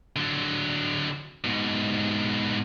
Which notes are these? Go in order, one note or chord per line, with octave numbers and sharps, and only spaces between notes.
D3 F#3
G#2 B2